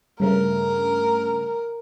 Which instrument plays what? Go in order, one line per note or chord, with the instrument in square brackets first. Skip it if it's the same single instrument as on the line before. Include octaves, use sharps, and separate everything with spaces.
[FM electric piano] G2 C#3 A3 [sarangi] A#4